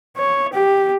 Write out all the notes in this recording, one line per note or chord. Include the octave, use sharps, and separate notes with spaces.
C#5
G4